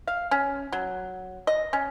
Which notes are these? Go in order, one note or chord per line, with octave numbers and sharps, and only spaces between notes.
F5
C#4
F#3
D#5
C#4